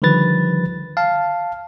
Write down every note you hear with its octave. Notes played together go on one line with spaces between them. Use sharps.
D3 D#3 F3 G3 B4 A6
F5 A5